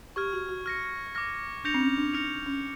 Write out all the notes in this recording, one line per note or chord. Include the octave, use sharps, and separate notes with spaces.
G4 C#6 F6 G#6
F#4
F#4
F6 A#6 C#7
D6 F6 A#6
D4 G6 A#6 C#7 F7
C4
C#4
D4
D#4 F6 A#6 C#7 F7
C#4